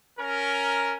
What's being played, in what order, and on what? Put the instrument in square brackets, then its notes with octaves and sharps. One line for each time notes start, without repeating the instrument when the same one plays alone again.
[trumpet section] C#4 A#4